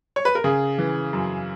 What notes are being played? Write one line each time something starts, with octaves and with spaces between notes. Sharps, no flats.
C#5
B4
A#4
C#3 G#4
E3
F#2